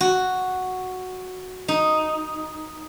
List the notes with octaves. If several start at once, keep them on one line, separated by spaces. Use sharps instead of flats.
F#4
D#4